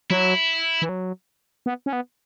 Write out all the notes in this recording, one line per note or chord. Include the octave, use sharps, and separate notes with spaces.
F#3 E4
E3
F#3
B3
C#4
B3